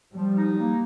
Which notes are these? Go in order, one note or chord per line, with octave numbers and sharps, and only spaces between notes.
F3 G3
D#4
A#3